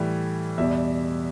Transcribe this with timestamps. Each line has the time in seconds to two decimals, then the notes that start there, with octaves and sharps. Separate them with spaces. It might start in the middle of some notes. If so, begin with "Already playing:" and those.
Already playing: A2 E3 G3
0.58 E2 B2 G3 E5